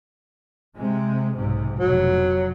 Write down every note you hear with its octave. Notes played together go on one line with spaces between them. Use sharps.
C3 G#3
B1 G#2 C3
F1 B2 F#3